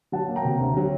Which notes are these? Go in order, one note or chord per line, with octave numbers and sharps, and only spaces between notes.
F#3 F#5 A5
A#3
G5 A#5
C3
D2
F#3